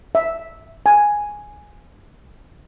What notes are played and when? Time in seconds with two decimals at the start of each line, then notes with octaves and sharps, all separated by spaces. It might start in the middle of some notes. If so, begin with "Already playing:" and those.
0.15 E5
0.86 G#5